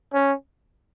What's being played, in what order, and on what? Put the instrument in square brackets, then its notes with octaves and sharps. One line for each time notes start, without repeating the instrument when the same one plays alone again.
[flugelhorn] C#4